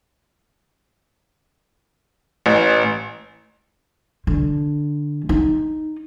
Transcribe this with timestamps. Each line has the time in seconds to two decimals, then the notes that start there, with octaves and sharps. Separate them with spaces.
2.46 A1
4.27 D3
5.29 D#4